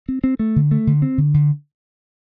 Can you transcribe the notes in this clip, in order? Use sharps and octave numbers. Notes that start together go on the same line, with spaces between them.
C4
C4
A3
D3
A3
D3
C4
D3
D3